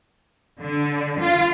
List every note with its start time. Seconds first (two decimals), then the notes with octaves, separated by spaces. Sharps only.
0.59 D3
1.20 F4